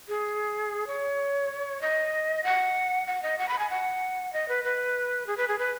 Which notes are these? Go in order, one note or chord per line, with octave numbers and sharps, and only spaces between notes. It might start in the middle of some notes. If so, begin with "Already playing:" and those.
G#4
C#5
D#5
F#5
F#5
D#5
F#5
B5
G#5
F#5
D#5
B4
B4
G#4
B4
G#4
B4